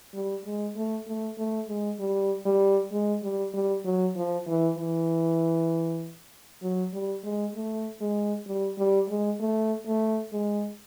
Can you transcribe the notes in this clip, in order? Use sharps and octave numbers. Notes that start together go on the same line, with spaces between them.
G3
G#3
A3
A3
A3
G#3
G3
G3
G#3
G3
G3
F#3
F3
E3
E3
F#3
G3
G#3
A3
G#3
G3
G3
G#3
A3
A3
G#3